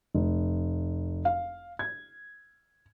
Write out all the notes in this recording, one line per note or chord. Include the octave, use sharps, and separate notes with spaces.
F1
F5
G#6